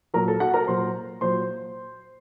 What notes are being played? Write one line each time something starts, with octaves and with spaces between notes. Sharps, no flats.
A#2 F#3 A#4 A#5
A4 A5
F#4 F#5
A#4 A#5
A#2 F#3 C5 C6
A#2 F#3 C5 C6